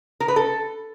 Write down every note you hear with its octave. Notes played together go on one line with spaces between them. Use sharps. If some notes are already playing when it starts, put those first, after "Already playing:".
A#4
B4
A4